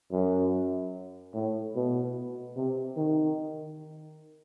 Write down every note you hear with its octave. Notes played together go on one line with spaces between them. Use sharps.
F#2
A2
B2
C3
D#3